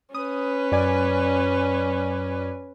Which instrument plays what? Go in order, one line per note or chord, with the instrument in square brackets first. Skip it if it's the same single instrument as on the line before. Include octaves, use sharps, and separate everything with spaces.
[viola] C#4 B4 [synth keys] D#6
[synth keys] F#2 D5 G#5